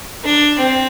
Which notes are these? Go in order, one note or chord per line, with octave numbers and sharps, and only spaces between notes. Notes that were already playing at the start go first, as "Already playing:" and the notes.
D4
C4